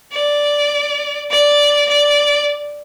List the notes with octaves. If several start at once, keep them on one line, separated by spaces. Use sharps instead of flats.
D5
D5
D5